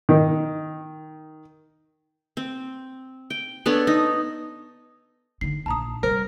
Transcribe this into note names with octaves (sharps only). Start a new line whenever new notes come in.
D#3
C4
G5
B3 D4 A4 C#5
D#4 D#5
D3 D#4 C7
A#1 D#3 A5 A#5 D#6
C3 G3 A#4 C5